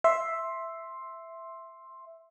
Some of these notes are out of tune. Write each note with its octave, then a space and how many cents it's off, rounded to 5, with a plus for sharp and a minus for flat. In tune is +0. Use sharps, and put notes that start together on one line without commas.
E5 +0 C6 +10